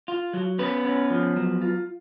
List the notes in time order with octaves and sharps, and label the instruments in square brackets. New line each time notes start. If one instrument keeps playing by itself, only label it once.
[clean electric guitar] F4
F#3
B3 C#4 B4
C#4
F3
F#3
F4